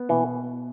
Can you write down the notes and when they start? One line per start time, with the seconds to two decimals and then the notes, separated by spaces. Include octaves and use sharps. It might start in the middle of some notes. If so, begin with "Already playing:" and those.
Already playing: B3
0.09 B2 E3